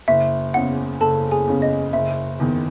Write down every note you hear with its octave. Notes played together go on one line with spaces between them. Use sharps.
F#1 E5
E2 C#3 F#5
F#1 A4 A5
G#4 G#5
E2 C#3
D#5
F#1 E5
E2 D#3